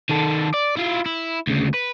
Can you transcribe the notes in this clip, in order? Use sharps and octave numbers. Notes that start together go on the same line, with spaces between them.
D#3 A4
D5
E4 F4
E4
D2 C#3
B4